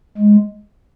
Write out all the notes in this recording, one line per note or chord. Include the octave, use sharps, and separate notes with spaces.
G#3